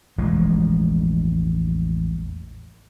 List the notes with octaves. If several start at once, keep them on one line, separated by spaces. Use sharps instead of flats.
E1 A1 F3 G#3